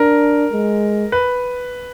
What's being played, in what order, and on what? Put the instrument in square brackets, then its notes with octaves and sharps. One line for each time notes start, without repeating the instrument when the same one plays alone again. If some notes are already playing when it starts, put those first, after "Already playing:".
Already playing: [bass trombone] D4 [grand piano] A#4
[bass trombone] G#3
[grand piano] B4